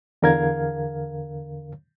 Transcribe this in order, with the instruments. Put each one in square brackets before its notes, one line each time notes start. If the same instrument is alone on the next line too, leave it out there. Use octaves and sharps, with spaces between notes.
[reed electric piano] E2 D3 A#4 F5 G#6